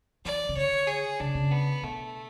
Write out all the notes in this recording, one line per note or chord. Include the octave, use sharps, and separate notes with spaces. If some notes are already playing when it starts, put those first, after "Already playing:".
E3 D5
C#3
D3 C#5
G#4
C#3 D4
C#3
B3
B2 A3